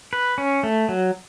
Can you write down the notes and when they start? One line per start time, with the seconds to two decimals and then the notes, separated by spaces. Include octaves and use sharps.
0.13 B4
0.38 C#4
0.63 A3
0.89 F#3